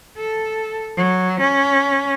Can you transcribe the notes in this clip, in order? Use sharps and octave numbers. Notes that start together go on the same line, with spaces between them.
A4
F#3
C#4